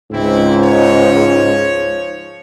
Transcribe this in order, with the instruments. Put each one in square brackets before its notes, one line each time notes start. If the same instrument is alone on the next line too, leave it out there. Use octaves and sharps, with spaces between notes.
[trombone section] C#2 G#2 [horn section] E3 C4 E4
[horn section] F3 C#5